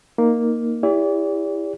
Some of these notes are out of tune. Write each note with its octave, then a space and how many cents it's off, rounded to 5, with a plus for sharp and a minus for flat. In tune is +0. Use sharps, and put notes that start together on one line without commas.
A#3 +0 D#4 +0
E4 +5 G4 +40 D5 -40